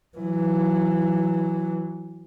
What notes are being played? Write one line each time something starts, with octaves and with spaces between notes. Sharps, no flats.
E3 F#3